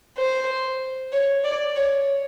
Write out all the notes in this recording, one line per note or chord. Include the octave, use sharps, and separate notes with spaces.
C5
C#5
D5
C#5